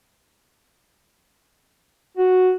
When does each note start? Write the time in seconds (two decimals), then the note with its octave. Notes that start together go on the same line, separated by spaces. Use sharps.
2.17 F#4